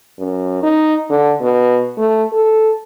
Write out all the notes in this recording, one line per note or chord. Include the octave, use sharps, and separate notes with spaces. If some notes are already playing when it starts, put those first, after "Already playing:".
F#2
D#4
D3
B2
A3
A4